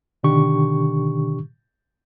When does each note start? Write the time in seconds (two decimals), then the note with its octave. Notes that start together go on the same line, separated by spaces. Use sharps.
0.23 B2 D3 D#3 D4 G4 C#6